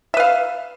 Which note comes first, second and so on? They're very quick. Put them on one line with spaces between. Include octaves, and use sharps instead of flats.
E5 B4 F5